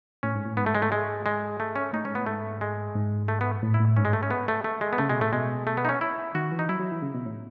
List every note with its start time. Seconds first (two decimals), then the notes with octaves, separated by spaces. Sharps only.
0.23 A2 C#4
0.35 G#2
0.46 A2
0.57 G#2 B3
0.66 A3
0.75 G#3
0.82 A3
0.92 G#3
1.26 G#3
1.60 A3
1.76 C#4
1.93 A2 D#4
2.05 G#2 C#4
2.15 A2 B3
2.27 G#2 A3
2.61 G#3
2.95 G#2
3.28 A3
3.41 B3
3.62 A2
3.74 E4
3.80 A2
3.97 G#2 C#4
4.05 G#3
4.13 A3
4.23 C#4
4.31 B3
4.48 A3
4.64 A3
4.81 G#3
4.93 B3
4.98 C#3 A3
5.09 B2 G#3
5.21 A2 A3
5.32 B2 G#3
5.67 A3
5.77 B3
5.85 D#4
5.89 C#4
6.01 E4
6.35 D#3 F#4
6.52 E3
6.59 D#4
6.69 F#3 E4
6.79 F#3
6.92 E3
7.02 C#3
7.14 B2
7.26 A2